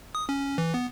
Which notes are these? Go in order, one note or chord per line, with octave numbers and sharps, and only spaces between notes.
D#6
C#4
E3
B3